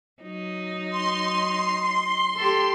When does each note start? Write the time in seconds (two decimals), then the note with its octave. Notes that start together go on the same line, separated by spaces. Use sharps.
0.22 F#3 D#4
0.90 C6
2.36 G4 A4